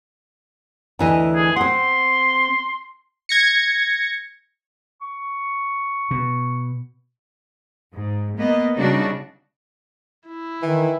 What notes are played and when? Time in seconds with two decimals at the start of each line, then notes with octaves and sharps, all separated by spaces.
0.99 D2 E3 D#5
1.36 G#4
1.56 C4 F#5 C6
3.29 G#6 A#6 C#7
5.01 C#6
6.11 B2
7.94 G#2
8.37 A#3 B3 D#5
8.77 C#3 G3 D4 D#4 F#4
10.27 E4
10.62 D#3 E3